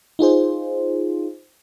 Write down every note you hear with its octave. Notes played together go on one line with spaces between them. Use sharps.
D#4 F4 G#4 C5